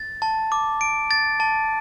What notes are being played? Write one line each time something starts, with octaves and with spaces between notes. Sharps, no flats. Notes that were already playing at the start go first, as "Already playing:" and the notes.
Already playing: A6
A5
D6
D7
A6
A5